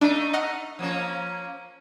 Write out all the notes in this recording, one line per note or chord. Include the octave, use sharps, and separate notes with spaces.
A3 D4 D#4
D#5 F#5 F6
F3 A#3 C#4